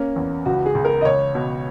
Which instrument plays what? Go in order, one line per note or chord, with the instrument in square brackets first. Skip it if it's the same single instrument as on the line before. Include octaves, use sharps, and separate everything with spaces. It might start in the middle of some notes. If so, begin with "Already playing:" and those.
Already playing: [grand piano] A#3 [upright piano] C#4
[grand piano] E2
[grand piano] C#2 [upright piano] F#4
[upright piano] G#4
[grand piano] C#2
[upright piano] A#4
D#5
[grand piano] C#2 [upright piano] C#5
[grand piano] B2